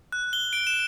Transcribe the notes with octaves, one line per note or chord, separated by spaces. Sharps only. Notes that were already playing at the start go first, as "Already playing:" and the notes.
F#6
G7
D7
E7